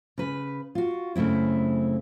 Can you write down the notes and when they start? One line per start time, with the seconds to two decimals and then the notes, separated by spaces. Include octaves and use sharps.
0.18 C#3 B4
0.75 F4 F#4
1.16 F#2 C#3 A3 C4 E4